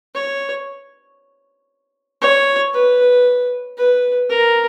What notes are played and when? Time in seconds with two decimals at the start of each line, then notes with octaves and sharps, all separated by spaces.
0.14 C#5
2.21 C#5
2.74 B4
3.77 B4
4.29 A#4